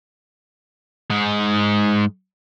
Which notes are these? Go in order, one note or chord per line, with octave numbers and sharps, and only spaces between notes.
G#2 G#3